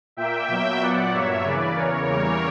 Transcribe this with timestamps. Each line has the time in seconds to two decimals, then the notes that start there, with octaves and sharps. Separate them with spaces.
0.17 A#2 A#3 E5 G5
0.48 B2 F#3 A#3
0.80 A#2 F#3 B3 D5 F#5
1.12 G2 F#3 A#3 C#5 E5
1.44 C#3 E3 A#3 B4 D5
1.76 E2 C#3 E3 A#4 C#5
2.07 E2 C#3 E3 G3 A#3